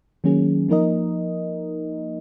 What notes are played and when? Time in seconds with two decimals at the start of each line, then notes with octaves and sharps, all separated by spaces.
0.24 D#3 F#3 A#3 C#4 G#4
0.69 F3 A#3 D#4 A#4 D#5